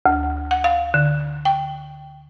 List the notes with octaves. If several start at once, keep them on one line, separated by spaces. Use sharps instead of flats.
D2
F#5
F5
D3
G5